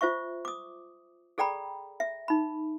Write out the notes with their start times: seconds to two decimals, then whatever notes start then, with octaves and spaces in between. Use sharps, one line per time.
0.01 F4 C5 E5 C#6
0.45 D6 D#6
1.38 G#4 A4 D5 G5 A#5 B5
2.00 E5
2.28 D#4 B5